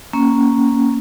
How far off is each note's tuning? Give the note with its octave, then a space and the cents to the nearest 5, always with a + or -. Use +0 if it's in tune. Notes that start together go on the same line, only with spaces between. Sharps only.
A#3 +0 C#4 +0